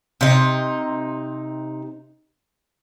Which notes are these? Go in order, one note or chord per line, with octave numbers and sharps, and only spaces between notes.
C3 D#4